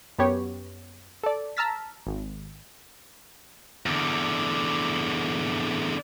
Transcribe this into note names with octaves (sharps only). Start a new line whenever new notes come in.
F#2 B3 G4 C#5
A4 D5
A5 A#5 E6 F6 A6 B6
G#1
E2 D3